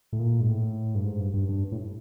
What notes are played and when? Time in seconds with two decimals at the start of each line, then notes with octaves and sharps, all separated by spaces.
0.13 A2
0.19 A#2
0.41 G#2
0.49 A2
0.95 G2
1.05 G#2
1.20 G2
1.34 G2
1.49 G2
1.72 A2